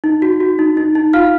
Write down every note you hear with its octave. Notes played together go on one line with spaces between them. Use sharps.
D#4
F#4
F#4
D#4
D#4
D#4
F4 F5 F6